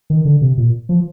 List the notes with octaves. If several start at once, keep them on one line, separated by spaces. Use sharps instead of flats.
D#3
D3
C3
A#2
F3